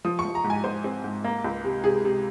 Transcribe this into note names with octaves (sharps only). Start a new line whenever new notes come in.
F3 D#6
C#6
F3
A#5
G#2
G#5
G#2 C5
C4
G#2
A#3
C#2
C3
C3 G#4
C3